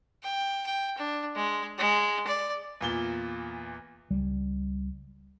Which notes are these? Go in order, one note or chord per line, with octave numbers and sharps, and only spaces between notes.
G5
G5
D4
G#3
G#3
D5
E2 A#2 G7
C#2 G3